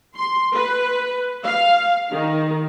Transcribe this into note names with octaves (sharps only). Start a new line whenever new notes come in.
C6
B4
F5
D#3